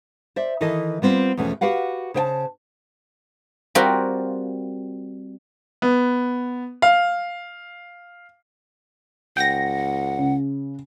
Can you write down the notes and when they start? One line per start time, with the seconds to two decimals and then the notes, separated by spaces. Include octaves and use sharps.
0.36 C5 D5 E5
0.61 D#3 E3 E4 A4 D#5
1.02 G3 B3 C4 F4
1.37 E2 B2 F3 A3 C#4
1.61 F#4 G4 B4 F5 F#5
2.14 C#3 C5 G5 A5
3.75 G3 C4 F4 F#4 A#4
5.82 B3
6.82 F5
9.37 C#2 F#5 G5 A#6
10.18 C#3